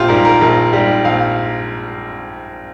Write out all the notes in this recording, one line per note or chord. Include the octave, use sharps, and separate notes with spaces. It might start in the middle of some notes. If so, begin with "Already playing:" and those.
Already playing: A#1 F4 G4
G#2 G3 A#4
A#4
A#1 F4
G#2 G3 G4
A#1 F5